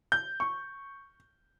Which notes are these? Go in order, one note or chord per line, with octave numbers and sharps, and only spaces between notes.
G6
C#6